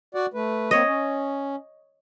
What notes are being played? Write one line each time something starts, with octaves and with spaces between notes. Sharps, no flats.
F#4 D5 F#5
A3 B4
A#3 C4 C#5 D#5
C#4